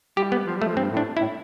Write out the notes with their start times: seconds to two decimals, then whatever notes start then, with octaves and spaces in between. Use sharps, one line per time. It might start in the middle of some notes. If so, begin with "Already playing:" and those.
0.17 G3 G4
0.32 B3
0.46 F3
0.56 G3
0.62 A3
0.66 F3
0.76 G2 C4
0.91 A2
0.97 D4
1.17 E4
1.21 A2